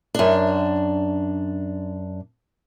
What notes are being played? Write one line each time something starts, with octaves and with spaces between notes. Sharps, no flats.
F#2 D4